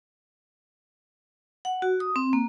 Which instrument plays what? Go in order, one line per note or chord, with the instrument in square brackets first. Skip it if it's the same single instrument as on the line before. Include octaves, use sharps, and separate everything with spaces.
[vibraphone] F#5
F#4
D#6
C4
A#3